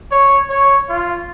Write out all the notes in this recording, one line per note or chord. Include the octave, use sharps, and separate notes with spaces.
C#5
C#5
F4